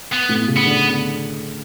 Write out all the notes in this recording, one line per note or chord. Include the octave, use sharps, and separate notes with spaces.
B3
A2
C#3
B3
D3